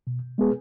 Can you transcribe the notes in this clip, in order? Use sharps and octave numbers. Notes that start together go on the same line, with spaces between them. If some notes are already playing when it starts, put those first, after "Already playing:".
B2
G#3 B3 G#4 B4